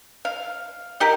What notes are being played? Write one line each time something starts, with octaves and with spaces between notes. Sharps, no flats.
F5
D#4 G4 A#4